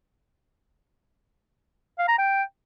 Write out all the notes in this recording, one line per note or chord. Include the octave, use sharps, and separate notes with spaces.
F5
A#5
G5